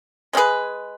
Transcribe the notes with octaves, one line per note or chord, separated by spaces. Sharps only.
G#3 C#4 G#4 B4